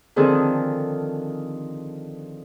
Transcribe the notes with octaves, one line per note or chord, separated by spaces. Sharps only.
D3 D#3 F3 C4 G#4 A4